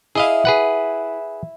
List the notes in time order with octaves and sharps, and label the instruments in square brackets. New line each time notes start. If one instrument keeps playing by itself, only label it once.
[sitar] E4 [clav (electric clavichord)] G#4 D#5 F5
[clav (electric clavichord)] G#4 B4 F#5